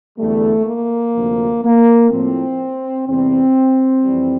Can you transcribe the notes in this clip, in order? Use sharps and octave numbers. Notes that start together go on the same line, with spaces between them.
E2 D3 G3 A3
A#3
D2 C3 F3
A#3
A2 F3 C4
E2 C3 G3 C4
F2 E3 G3